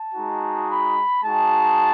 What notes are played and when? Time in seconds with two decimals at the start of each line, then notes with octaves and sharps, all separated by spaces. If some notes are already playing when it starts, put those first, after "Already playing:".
Already playing: A5
0.15 G#3 D#4 F#4
0.69 B5
1.22 G#3 D#4 F#4 A5